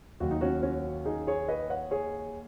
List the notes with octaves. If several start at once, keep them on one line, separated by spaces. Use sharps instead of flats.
D#2 D#3 F#3 F#4
D#4
C#4 F#4
C#4 F#4
D#4 G#4
G#4 C#5
B4 D#5
C#5 F#5
G#4 C#5